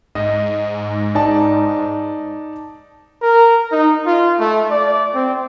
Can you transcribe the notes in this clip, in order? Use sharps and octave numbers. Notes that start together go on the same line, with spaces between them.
G#2 D#5
D#4 D5 A5
A#4
D#4
F4
A3
D5
C4